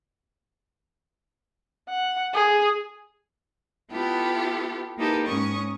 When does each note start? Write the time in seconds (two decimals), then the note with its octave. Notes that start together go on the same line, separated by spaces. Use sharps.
1.89 F#5
2.34 G#4
3.92 B3 E4 F4 G4 A4
4.98 A#3 D#4 E4 G4 A4 B4
5.26 G#2 C#4 C#6 D#6